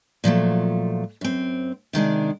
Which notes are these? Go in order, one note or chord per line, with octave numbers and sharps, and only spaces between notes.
A#2 F3 F#3 A3
F#2 C4
C3 D#3 G#3 D4